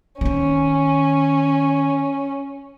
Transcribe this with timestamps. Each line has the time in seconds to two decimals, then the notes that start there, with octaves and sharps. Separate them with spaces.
0.21 D#3 C4 C#4